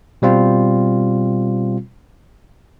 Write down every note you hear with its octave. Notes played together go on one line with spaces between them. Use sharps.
B2 G3 C4 F4